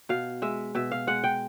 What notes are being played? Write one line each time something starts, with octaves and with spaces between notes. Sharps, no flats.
B2 F5
G#3 E5
B2 E5
F5
G#3 F#5
G5